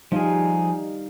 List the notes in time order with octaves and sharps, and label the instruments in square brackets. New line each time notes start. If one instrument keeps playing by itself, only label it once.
[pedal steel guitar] F3 G#4 [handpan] G3 D#4 F5